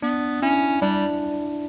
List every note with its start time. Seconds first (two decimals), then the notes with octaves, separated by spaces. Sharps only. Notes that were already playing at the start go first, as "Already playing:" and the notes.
0.02 B3 D4
0.42 C#4 E4
0.82 G3 D4